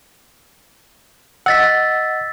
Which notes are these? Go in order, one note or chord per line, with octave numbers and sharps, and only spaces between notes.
D#5 F#5 E6 A6 B6